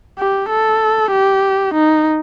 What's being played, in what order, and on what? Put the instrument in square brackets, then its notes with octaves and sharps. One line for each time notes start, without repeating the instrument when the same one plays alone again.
[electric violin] G4
A4
G4
D#4